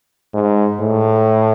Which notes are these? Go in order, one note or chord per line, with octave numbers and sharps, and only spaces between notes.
G#2
A2